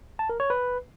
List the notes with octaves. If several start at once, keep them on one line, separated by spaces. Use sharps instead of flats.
A5
A#4
C#5
B4